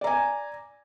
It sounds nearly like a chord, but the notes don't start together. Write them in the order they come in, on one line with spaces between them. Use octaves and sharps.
D5 A#5 G#5